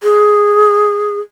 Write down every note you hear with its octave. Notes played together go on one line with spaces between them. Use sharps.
G#4